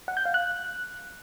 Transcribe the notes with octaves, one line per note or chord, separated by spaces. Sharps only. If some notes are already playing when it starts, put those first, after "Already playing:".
F#5
G6
F5
F#6